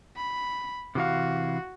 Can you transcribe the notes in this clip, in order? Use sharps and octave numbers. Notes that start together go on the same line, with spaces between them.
B5
C3 E3 F#4 F5